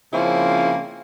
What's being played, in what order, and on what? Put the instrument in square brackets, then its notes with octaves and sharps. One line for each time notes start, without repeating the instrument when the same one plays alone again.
[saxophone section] C#3 F3 A#3 C4 C#4 E4